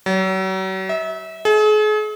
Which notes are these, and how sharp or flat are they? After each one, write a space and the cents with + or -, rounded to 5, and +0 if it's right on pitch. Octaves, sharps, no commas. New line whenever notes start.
F#3 +40
E5 -30
G#4 +40